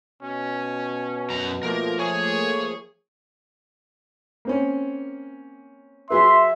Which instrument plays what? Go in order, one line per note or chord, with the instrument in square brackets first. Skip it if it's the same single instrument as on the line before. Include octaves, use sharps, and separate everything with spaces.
[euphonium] B2 [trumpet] C#4
[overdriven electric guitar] F#2 A#5
[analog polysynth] F3 A3 A#3 [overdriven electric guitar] A#4
[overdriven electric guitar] G#4 [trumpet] C#5
[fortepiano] A#3 C4 C#4
[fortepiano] F#3 G#4 B4 [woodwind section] E5 [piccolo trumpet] C6